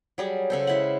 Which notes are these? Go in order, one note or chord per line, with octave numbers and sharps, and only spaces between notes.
F#3 G3 G#4
C#3 A4 C5
G#3 E4 F#5